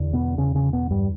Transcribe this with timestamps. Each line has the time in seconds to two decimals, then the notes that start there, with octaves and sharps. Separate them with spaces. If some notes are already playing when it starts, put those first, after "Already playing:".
Already playing: E2 D3
0.13 B2 B3
0.38 C#3 C#4
0.55 C#3 C#4
0.73 B2 B3
0.91 G2 G3